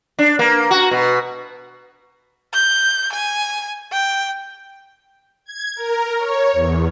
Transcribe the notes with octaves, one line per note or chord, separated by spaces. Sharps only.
D4
A#3
F#4
B2
G6
G#5
G5
G#6
A#4
C#5
E2